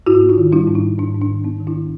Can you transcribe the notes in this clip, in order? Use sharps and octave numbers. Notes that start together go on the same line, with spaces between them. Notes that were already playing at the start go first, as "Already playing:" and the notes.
G#2 E4 F#4
B3
D#4 F4
D#3
G3 D4 E4
G#2
D#4
G#2
G#2 D4
G#2
D4
D#3
B3 D#4
D#3
D4 E4
D#3